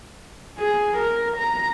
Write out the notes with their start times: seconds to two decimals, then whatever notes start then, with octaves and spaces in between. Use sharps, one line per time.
0.59 G#4
0.97 A#4
1.37 A#5